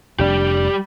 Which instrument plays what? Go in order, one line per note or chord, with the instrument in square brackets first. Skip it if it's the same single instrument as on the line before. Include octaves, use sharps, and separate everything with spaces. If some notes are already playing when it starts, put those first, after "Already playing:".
[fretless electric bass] F1 D4 [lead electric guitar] G3 G4